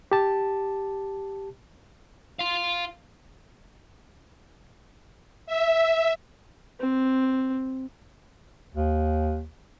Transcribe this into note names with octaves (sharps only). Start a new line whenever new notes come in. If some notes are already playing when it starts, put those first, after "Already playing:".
G4 A5
F5 C6
E5
C4
D#2